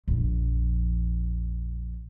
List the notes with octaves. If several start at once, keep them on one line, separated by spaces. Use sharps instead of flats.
A#1 F2